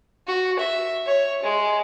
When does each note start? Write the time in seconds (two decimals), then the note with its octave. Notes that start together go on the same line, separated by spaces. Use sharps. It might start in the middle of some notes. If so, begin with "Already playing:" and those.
0.27 F#4
0.59 E5
1.06 C#5
1.42 G#3